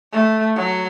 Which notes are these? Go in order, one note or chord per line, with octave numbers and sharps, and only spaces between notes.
A3
F#3